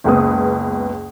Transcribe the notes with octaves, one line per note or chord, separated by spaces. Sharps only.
F#1 C#2 B3 D#6